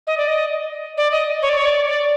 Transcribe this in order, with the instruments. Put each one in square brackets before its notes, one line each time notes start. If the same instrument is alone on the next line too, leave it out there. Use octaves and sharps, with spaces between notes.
[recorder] D#5
D5
D#5
D5
D#5
C#5
D5
C#5
D5
D5